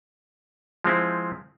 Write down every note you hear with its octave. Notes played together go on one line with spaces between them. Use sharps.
F3 G#3 C4 E4